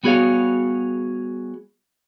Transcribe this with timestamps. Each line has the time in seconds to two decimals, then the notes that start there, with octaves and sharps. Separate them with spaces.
0.03 G3 B3 F#4 G#4 C#5 F5